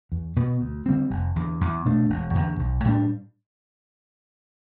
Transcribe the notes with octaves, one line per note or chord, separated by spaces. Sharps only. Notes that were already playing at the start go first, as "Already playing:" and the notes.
E2
B2 B3
D2
D3 G3 C4
F1
E2 D3
E2
B2 A3 D4
E1
E2 D3
B1
A2 G3 D4